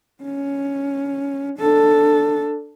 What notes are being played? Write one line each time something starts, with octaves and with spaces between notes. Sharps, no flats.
C#4
D4 A4